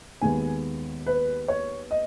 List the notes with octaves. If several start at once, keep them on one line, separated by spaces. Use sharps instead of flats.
D#2 D#3 G#3 B3 G#5
B4
C#5
D#5